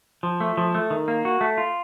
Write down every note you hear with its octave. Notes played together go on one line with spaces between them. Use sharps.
F3
A3
F3
A3
D#3
A#3
F#4
A3
F4